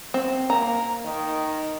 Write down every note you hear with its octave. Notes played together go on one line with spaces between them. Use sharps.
C4
A#3 A#5
D#3